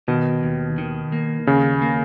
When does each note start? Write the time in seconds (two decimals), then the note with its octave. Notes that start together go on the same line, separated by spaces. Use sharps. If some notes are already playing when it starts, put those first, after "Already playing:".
0.08 B2 D#3
0.43 D#2
0.78 D#3
1.12 A#3
1.47 D#2 C#3
1.82 A#3